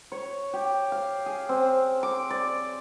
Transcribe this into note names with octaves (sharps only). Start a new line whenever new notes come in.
C#5
G4
F5
G#4
C4
D6
D5